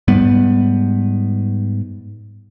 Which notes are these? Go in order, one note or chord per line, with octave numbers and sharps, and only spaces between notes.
G#2 G3 B3